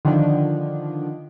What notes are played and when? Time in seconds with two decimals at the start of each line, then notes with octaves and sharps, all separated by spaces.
0.05 D3 D#3 F3 D4